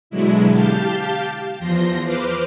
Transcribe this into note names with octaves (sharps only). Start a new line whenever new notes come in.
B2 D3 F#3 G#3 E4
G4 F5 G5 A5
E2 F3 C6 A#6
B4 C5 D6 F6